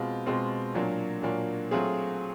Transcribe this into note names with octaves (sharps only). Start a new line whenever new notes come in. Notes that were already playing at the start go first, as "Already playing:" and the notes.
Already playing: B2 G#3 C4 F4
B2 G#3 C4 F4
A#2 F#3 A#3 D4
A#2 F#3 A#3 D4
F#3 A3 C4 F4 G#4